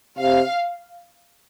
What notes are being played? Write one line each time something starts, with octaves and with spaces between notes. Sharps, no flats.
C3 F5